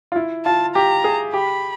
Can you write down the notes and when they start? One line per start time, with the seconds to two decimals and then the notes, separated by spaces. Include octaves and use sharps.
0.12 F4
0.16 E4
0.45 F4 A5
0.75 G4 A#5
1.04 G#4
1.33 G4 B5